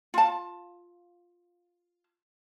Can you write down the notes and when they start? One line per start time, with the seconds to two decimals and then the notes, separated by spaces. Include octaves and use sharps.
0.14 F4 A5